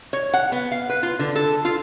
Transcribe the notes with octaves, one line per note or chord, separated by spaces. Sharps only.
C#5
F#5
B3
F5
B4
F4
D3
A4
F4